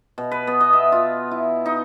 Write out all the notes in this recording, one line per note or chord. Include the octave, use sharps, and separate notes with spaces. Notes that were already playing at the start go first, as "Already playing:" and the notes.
B2
B4
B3
D#5
E5
F4
E4
D#4